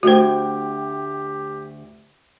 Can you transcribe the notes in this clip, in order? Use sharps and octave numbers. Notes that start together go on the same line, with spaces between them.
D2 F#4 G4 C5 G5